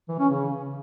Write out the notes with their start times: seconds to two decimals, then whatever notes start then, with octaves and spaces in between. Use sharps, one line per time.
0.08 E3
0.19 C#4
0.29 C#3